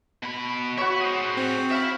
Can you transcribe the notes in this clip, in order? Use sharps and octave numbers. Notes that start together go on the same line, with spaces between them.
B2 B5
F#4 C#5 E5 B5
G#4 C5
C4
E5 F5 B5